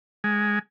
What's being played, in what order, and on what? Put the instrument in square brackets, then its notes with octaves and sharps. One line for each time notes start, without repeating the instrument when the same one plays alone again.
[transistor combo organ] G#3